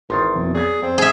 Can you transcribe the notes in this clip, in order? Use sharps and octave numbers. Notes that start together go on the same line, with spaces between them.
G#1 D#3 E3 C6 A6
F2 B2
F#3 B3 G#4 D5 G#6
F2 C4
G#2 A3 G#4 E5